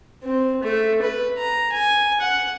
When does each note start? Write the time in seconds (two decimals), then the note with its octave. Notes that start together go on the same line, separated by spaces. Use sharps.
0.23 C4
0.63 A3
1.02 B4
1.38 A#5
1.72 G#5
2.21 F#5